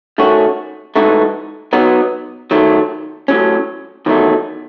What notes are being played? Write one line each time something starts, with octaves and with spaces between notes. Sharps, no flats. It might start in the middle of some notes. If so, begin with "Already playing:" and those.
D#3 A3 C#4 F#4
G#2 E3 A3 D#4 F#4
F#3 B3 D#4
D#3 F#3 A3
A2 F#3 C#4
E2 D#3 F#3 A3 D#4